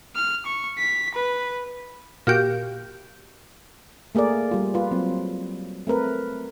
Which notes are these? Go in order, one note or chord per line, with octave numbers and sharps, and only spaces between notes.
F6
C#6
B6
B4
A#2 F#4 G4
A3 A#3 G#4 A#4 D5
G3 F4
F4 B4
F#3 C4
A3 C4 A#4 B4